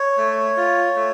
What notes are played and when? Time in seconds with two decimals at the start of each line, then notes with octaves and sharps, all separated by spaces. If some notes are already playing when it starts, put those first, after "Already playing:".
Already playing: C#5
0.17 A3
0.57 F4
0.96 A3